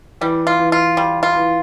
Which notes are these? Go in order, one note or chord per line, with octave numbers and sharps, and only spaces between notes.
E3 G3
F4
E3
F4
G3
F4
E3